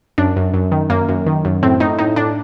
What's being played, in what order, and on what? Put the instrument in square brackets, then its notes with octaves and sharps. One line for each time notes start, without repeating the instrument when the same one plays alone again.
[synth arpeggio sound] F#2 D4
F#2
F#2
D#3
F#2 A#3
F#2
D#3
F#2
A2 C4
A2 D#4
A2 D#4
A2 D4